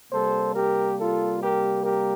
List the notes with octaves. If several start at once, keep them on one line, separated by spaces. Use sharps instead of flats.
C3 G3 A#3 A4 C5
G4 A#4
F4 A4
G4 A#4
G4 A#4